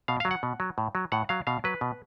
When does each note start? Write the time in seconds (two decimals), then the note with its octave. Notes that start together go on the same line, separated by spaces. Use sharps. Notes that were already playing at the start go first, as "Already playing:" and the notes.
0.08 B2 F5
0.20 F5
0.25 F#3
0.31 F#5
0.43 B2
0.60 F#3
0.78 A2
0.95 F#3
1.12 A2 F#5
1.29 F#3 F5
1.47 B2 F5
1.64 F#3 B4
1.81 B2